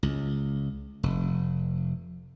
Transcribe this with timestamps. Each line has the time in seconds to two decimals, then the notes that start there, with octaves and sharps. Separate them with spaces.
0.03 C#2
1.03 F1